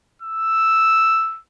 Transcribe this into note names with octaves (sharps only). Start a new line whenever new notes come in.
E6